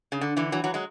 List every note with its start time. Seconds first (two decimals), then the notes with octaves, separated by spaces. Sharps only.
0.12 C#3
0.21 D3
0.37 D3 E3
0.52 E3 F#3
0.64 E3 F#3
0.74 F#3 G#3